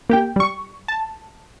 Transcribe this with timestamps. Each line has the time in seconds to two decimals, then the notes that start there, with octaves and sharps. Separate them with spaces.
0.09 A#3 G4 G5
0.36 G3 C#6
0.88 A5